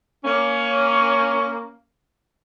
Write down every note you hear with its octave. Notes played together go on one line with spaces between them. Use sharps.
A#3 C#4